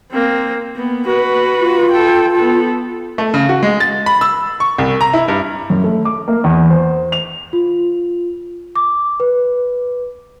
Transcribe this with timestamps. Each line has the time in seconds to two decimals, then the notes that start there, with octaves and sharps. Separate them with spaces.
0.11 A#3 C4
0.76 A#3 B3
1.06 F#4 B4
1.60 F4
1.91 A4 G5
2.36 B3 A4
3.18 A3
3.34 C#3
3.49 F#4
3.63 G#3
3.80 A6
4.06 B5
4.21 E6
4.60 C#6
4.78 C2
5.01 A#5
5.13 E4
5.28 G2
5.70 F#2
5.84 A3
6.05 D6
6.28 A#3
6.44 E2
6.70 C5
7.12 F7
7.53 F4
8.76 D6
9.20 B4